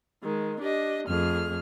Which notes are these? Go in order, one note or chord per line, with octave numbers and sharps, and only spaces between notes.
D#3 G#3
D4 G4 D#5
F2 A3 G#4 F6